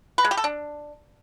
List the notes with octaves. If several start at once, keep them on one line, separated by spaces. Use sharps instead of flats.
B4
G#3
G4
A4
D4